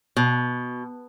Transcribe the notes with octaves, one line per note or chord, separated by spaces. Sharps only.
B2